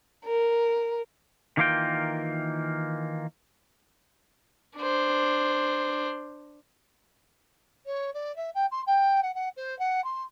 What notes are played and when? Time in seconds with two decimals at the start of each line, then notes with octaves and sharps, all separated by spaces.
0.24 A#4
1.57 D#3 E3 A#3 F4 A#4 G5
4.78 D4 C5
7.86 C#5
8.13 D5
8.36 E5
8.55 G5
8.71 C6
8.87 G5
9.22 F#5
9.34 F#5
9.56 C5
9.79 F#5
10.04 C6